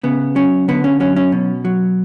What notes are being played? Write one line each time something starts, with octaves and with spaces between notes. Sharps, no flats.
C#3 B3
F#3 C#4
D3 B3
C#4
F#3 C#4
C#4
B2
F#3